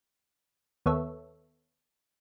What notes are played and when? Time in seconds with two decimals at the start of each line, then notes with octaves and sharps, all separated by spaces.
0.86 D#2 B3 A4 C#5 E5